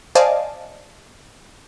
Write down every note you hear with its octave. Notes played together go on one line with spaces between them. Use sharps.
C5 D5 D#5 F5 G#5 A5